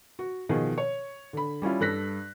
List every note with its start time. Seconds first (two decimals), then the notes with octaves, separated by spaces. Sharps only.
0.19 F#4
0.49 B2 D#3 F3 G#4
0.78 C#5
1.33 D3 B5
1.62 G3 C#4 E4 F4
1.80 G2 A4 F#6 A#6 B6